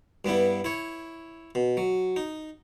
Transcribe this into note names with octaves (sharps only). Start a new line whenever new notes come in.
G2 G3 B3 E4
E4 C#5
B2
F#3
D#4